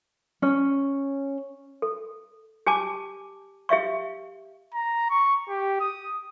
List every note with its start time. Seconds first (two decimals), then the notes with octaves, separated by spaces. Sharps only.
0.42 C#4
1.82 A4
2.67 G4 G#5 A5 D6
3.69 G4 E5 F5 C#6
4.75 A#5
5.10 C#6
5.49 G4
5.80 D#6